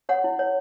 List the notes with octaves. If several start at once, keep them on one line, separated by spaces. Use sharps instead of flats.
C#5 F#5
E4
C#5